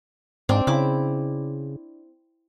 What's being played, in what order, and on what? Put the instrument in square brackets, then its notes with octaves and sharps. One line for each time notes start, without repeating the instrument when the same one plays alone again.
[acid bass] G#2 [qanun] C4 D4 D5
[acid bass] C#3 [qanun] E4 D6